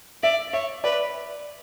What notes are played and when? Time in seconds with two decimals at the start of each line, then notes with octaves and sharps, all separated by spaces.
0.23 D5 E5
0.53 C#5 E5
0.84 B4 D5